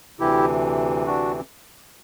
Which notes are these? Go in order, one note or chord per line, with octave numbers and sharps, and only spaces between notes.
D2 C3 E3 E4 G4
D4 F#4